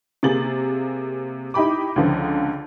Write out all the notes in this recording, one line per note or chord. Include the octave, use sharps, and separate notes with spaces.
C3 A#3 G#4 A6 F#7
D#4 E4 G4 B5 D6
C#2 D3 F3